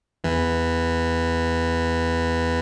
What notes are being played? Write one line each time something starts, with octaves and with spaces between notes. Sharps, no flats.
E2 E3